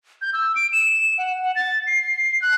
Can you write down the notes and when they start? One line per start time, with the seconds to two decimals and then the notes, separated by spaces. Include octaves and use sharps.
0.22 G6
0.33 E6
0.56 D7
0.73 E7
1.18 F#5
1.42 F#5
1.56 A6
1.87 C7
2.42 F#6